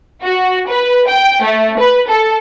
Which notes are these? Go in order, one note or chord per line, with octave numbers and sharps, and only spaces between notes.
F#4
B4
G5
A3
B4
A4